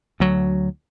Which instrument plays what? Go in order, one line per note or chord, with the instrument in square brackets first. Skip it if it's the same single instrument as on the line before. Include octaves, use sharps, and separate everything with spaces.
[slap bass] D2 F#3